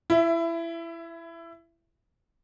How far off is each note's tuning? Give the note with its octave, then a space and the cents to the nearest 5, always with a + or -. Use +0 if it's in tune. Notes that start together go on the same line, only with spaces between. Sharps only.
E4 +20 E5 +0